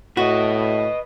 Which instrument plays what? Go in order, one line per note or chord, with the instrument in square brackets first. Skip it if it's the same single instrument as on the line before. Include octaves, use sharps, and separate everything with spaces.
[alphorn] A2 [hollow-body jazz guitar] F#4 [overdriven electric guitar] B4 D#5